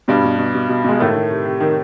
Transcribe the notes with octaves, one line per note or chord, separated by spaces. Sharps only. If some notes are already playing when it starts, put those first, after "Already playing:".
G2 B2 G3
B2
B2
B2
B2
B2 G#3
A2 D#3 A3
D#3
C3
C3
D#3